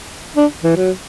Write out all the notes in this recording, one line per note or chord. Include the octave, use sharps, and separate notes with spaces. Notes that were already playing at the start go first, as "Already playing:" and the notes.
D4
E3
F#3